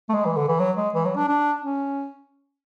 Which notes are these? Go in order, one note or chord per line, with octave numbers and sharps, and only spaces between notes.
A3
G#3
E3
D3
E3
F#3
G#3
E3
F#3
D4
D4
C#4